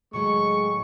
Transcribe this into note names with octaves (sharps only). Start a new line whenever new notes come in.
A2 D#3 F#3 G#3 C#6